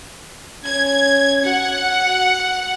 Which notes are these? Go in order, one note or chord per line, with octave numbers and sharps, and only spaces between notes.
C#4 G#6
F#4 F#5